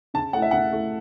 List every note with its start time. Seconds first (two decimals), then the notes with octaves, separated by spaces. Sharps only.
0.14 C#3 A5
0.33 A3 E4 F#5
0.42 E5
0.51 C#3 F#5
0.72 A3 E4